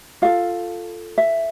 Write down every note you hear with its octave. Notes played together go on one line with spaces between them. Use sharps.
F4 A4 F5
E5